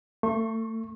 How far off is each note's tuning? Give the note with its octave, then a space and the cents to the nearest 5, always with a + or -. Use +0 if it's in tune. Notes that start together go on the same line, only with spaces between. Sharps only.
A3 +30 C#6 -40